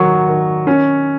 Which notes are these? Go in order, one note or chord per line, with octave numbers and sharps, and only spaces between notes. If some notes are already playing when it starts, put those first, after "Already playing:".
Already playing: D#3 F#3 C#6
D#3
C#4